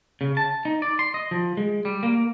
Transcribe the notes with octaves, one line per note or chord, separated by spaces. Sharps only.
C#3
A5
D#4
D5
C6
D#5
F3
G#3
G3
A#3